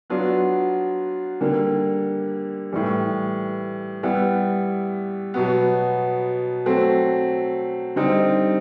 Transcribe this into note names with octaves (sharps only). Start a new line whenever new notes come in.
F#3 B3 D4 F4
D3 G3 A#3
A2 E3 G3
G3 B3 E4
B2 F#3 B3
F#3 A3 C4
D3 G3 C4 D#4